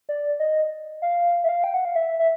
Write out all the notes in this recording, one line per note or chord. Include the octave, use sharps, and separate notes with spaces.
D5
D#5
F5
E5
F5
G5
F#5
F5
E5
E5